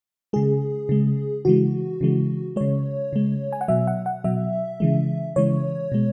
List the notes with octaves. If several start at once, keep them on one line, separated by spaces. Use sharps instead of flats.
C#3 G#3 G#4
C#3 G#3
C#3 E3 G#3 F#4
C#3 E3 G#3
C#3 G#3 C#5
C#3 G#3
G#5
F#5
B2 F#3 E5
F#5
F#5
B2 F#3 E5
C#3 E3 G#3
C#3 E3 G#3 C#5
B2 G#3